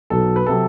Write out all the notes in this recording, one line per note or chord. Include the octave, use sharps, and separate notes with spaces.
B1 B2 F#3 A4
B4
C3 F#3 A4